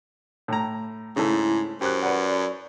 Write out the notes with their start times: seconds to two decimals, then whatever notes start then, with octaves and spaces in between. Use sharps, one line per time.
0.48 A2 A#5
1.16 G#2 C#3 A3 E4
1.81 F#2 G4 C5 F#6
2.03 B4 D5 F#5